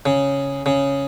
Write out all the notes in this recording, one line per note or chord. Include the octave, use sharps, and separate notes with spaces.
C#3
C#3